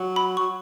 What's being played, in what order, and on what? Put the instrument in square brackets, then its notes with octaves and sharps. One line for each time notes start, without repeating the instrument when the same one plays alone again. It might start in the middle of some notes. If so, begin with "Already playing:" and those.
Already playing: [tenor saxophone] F#3
[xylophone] B5
[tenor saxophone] F#3 [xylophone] C#6